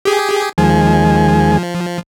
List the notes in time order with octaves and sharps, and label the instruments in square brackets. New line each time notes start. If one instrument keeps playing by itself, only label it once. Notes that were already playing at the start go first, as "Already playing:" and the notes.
[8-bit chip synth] G4 G#4
[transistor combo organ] D#2 G#3 G#5 [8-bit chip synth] F3